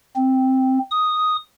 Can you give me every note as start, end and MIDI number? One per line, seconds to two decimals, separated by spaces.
0.16 0.79 60
0.91 1.36 87